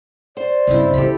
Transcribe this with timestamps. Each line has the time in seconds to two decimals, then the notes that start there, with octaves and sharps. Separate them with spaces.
0.37 C5 D5
0.67 G2 C#3 G#3 C4 E4
0.94 C#3 E3 G4 A4 B5